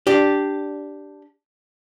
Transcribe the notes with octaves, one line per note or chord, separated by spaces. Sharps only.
D4 G4